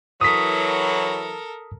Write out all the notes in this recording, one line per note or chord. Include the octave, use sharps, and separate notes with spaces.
E3 F#3 A4 A#4 D#6 B6